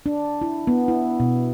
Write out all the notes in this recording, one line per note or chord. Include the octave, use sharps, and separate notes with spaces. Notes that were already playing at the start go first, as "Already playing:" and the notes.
D4
E4
B3
E4
B2